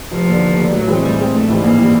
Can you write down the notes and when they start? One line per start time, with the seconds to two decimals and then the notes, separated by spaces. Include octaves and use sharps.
0.11 F1 F3
0.27 D#2 D3
0.42 F1
0.58 D#2 D3
0.72 A2 F#3
0.87 E3 G#3 C4
1.02 A2 G3
1.18 E3 G#3 C4
1.33 A#1 A3
1.48 G#2 E3 G3
1.63 A#1 A#3
1.79 E3 G3